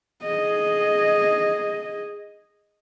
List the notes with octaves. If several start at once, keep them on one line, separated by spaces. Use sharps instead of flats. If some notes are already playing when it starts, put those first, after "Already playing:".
G#4 D#5